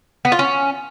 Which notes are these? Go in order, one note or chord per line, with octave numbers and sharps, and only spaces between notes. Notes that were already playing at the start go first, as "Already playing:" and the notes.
B3
F4
C#4